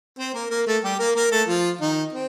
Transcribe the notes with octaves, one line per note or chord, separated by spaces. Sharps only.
C4 C5
A#3 A#4
A#3 A#4
A3 A4
G3 G4
A#3 A#4
A#3 A#4
A3 A4
F3 F4
D#3 D#4
C4